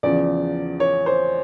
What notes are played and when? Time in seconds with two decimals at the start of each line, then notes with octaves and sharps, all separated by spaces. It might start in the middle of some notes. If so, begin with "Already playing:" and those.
0.03 E2 C#3 F3 D5
0.80 C#5
1.06 C5